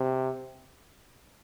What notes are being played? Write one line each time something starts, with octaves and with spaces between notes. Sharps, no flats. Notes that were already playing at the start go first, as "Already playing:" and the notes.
Already playing: C3